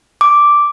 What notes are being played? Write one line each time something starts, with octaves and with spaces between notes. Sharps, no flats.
D6